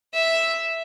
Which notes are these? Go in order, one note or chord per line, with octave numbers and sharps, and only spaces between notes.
E5